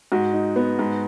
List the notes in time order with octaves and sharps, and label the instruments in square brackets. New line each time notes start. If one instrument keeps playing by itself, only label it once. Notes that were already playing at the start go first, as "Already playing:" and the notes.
[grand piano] G#2 [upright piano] F#4
[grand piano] D#4
B3
G#2